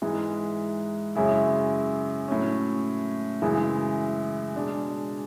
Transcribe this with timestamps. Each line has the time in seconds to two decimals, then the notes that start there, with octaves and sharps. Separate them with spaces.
0.02 G#2 E3 G#3
1.15 F#2 C#3 G#3 C#4 E4
2.28 A2 F#3 C#4
3.42 F#2 C#3 E3 G#3
4.55 B2 G#3 D4